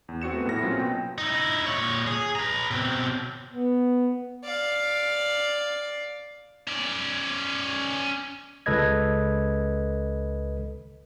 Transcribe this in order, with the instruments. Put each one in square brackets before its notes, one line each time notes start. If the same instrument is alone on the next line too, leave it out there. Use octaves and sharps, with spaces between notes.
[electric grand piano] E2
C4 F#4 C#7 E7
A3 B3
A#1 A2 E4 A#6
F#3 A#3 C4 C#4 F4 F#4
B2 G5
[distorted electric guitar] D#4 E4
A#2 C#5
G#4
B4 A#5
B2 C4
[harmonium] B3
[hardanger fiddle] D5 F5
[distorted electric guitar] C#4 D5
[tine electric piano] C#2 A4 B4 D#5 G#6